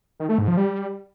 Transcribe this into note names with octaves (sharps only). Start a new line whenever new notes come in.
D#3
A3
G#2
F3
G3